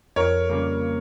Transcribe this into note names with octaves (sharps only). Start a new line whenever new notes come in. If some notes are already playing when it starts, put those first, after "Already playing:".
F2 A#4 C#5
C#3 G3 A#3